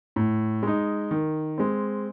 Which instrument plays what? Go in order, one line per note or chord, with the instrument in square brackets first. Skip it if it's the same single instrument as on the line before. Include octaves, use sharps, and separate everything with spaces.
[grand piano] A2
G#3 D#4
D#3
G#3 C4